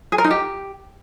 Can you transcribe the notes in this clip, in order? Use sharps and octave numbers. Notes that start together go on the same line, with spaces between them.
G#4
A#4
D#4
G4